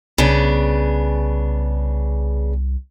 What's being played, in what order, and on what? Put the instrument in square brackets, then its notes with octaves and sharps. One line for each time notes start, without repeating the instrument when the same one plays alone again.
[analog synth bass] C2 [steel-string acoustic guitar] C#3 B3 D4